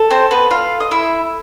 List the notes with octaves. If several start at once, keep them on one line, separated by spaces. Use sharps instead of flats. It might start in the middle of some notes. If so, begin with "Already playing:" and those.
Already playing: A4
C4 C5
B3 B4
F4 F5
D#5
E4 E5